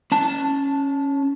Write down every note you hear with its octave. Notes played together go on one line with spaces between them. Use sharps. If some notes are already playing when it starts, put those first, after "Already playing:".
C#4 A5